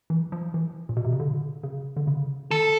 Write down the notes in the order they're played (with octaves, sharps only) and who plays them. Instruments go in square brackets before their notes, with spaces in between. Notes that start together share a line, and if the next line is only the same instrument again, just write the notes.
[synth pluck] E3
F3
E3
A#2
B2
C3
C#3
D3
C#3
D3
C#3
[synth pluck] D#3 [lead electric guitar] A4